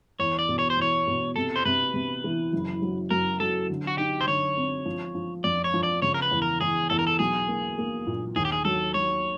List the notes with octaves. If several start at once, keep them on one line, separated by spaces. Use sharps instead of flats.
E2 C#5
D5
B2
C#5
C5
E2 C#5
B2
C3 A4
C5
C3 B4
C3
E3
F#1
F#3
F#2 A#4
F#3 A4
D3
F#4
D#4 G4
C5
D3 C#5
C4
F3
F3
F2 D5
C#5
F3
D5
C#3 C#5
A#4
B4
E2
A#4
E2 G#4
E2 A4
A#4
A4
B1 G#4
A#3
A#3
A#2
D#2 G#4
G4
G#4
F#3 A4
F#3 C#5